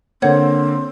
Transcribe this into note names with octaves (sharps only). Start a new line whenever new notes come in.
D3 A#3 C4 C5 C#5 F#5